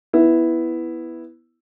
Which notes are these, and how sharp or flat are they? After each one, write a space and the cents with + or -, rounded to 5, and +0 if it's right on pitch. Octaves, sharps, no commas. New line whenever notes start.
B3 +0 E4 +0